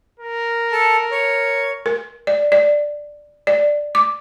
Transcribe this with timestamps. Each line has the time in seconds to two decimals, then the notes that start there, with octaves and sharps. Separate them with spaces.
0.19 A#4
0.72 A4 A5
1.11 C#5
1.86 A#4
2.27 D5
2.52 D5
3.47 D5
3.95 D6